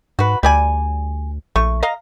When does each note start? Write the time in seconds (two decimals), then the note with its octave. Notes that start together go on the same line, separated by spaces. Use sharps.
0.19 G#2 F#4 B4
0.43 D2 G3 D5 G#5
1.56 A#1 A3 C#6
1.83 D#5 F5 A#5